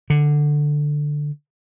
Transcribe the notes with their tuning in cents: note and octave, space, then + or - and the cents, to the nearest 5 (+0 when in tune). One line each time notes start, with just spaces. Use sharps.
D3 +10